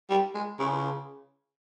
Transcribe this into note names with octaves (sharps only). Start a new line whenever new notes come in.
G3
G#3
C#3